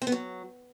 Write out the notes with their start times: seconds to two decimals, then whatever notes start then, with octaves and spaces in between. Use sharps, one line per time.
0.02 C4
0.07 B3
0.12 F#3